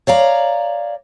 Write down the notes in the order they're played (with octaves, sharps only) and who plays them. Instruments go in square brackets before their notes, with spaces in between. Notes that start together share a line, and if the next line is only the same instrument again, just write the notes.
[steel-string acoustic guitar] C#5 D5 F5 A#5